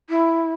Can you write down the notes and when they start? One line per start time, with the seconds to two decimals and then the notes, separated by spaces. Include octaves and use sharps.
0.10 E4